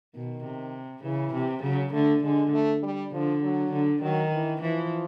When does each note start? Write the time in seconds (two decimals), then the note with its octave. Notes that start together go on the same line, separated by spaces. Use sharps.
0.14 B2 D#3
0.44 C3
1.04 C#3 E3
1.34 C3
1.63 C#3 F#3
1.93 D3 A3
2.23 D3 G#3
2.53 A3
2.83 G3
3.12 D3 F3
3.43 F#3
3.72 D3
4.02 D#3 F#3
4.32 E3
4.62 E3 F3